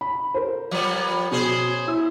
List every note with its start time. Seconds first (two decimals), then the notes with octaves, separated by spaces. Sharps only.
0.01 B5
0.34 A#4 C5
0.71 F3 G3 B3
1.31 B2 C#4 G#4 C5
1.87 E4 E6